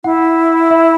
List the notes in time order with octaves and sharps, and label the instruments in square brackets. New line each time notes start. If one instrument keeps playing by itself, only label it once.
[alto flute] E4 [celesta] F#5
[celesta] E5